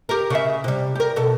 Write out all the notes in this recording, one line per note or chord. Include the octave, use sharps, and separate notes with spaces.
G4 A#4
C#3 E5
C3 G3
G4 A#4
B2 A4